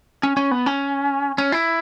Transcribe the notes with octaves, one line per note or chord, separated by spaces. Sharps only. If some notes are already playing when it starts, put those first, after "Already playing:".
C#4
C#4
B3
C#4
C#4
E4